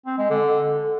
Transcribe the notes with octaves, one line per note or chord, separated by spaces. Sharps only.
C4
G#3
D3